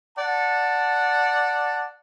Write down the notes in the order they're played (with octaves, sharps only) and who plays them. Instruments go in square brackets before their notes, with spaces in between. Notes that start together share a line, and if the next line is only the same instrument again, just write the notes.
[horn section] D5 F#5 A5